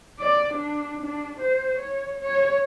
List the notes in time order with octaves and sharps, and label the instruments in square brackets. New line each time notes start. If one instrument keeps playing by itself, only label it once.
[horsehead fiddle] D5
D4
D4
C5
C#5
C#5